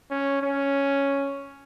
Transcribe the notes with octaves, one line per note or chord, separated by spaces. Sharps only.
C#4
C#4